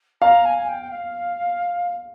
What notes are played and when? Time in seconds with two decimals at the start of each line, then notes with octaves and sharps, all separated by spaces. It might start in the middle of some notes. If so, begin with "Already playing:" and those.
0.21 F5 A#5
0.45 G#5
0.57 G#5
0.68 G5
0.82 G5
0.90 F5